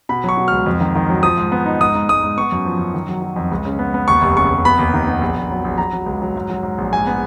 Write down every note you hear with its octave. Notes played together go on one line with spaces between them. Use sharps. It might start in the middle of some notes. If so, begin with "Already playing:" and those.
B2 B5
F#3 C#6
B2
C#2 F6
F2
D#3
D#3
F#3
F3 D#6
G#2
B3
D#4
G#2 D#6
G#2
G#2 D#6
G#2
B3 C#6
F#2
F3
F#2
D#3
F#3
F#3
F2
C#2
C#3
B3
B3
D#2 C#6
F1
C#3 C#6
F1
B3 B5
D#2
D#3
B3
A#1
A#1
F#3
A#1
F#3 A#5
F#3
C#2
F#3
G#2
F#3
G#2
A#1
G#2 G#5
B3